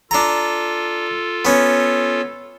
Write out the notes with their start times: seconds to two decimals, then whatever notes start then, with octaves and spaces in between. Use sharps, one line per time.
0.11 D4 F4 A4 A#5
1.45 B3 C#4